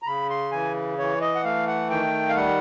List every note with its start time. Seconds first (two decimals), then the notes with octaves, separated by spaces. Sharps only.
0.02 A#5
0.07 C#3 B5
0.30 C6
0.52 E3 G#5
0.98 E3 C#5
1.21 D#5
1.35 F#5
1.44 A3 F5
1.67 F#5
1.90 D#3 G5
2.29 F5
2.35 G3 F#5